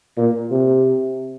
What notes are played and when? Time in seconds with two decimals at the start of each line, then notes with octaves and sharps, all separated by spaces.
0.17 A#2
0.51 C3